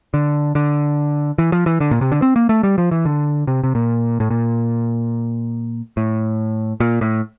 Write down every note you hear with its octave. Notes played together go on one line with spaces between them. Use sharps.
D3
D3
E3
F3
E3
D3
A#2
C3
D3
C4
A#3
A3
G3
F3
E3
D3
C3
C3
A#2
A2
A#2
A2
A#2
A2